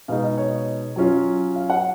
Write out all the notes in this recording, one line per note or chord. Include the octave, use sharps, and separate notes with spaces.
B2 G#3 D#4 F5
D#5
C#5
F#3 C#4 F4
F5
F#5